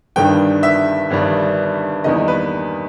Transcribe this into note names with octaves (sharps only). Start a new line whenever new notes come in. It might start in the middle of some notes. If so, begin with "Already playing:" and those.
G1 G2 D#3 G3 G5
E5
G1 G2 D#3 G3
E2 D#3 G3 A#3 D#5
B4